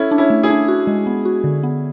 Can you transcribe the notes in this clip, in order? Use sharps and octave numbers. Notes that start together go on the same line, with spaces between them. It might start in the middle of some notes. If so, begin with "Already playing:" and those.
Already playing: C#4 E4 A4
D4
C#4 E4
A3
E4 G#4
D4
F#4
G#3
B3
F#4
D3
B3